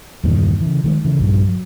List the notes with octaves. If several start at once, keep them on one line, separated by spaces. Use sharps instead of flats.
E2 G2 A#2 D#3
C#3 E3
D#3 G3 G#3
C#3 E3
A#1 G2
F#3